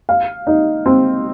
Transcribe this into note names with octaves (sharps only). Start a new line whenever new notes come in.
F5
D#4
C4